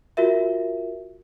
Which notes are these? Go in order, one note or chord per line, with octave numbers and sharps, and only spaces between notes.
F4 F#4 A#4 E5